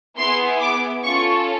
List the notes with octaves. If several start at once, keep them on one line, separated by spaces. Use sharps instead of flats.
B3 E4 G#4 C6
D6
C#4 F4 A4 C#6